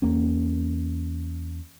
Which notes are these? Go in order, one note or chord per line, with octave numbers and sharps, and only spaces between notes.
E2 A#3 C#4